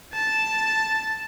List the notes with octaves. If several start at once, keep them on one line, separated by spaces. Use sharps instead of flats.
A5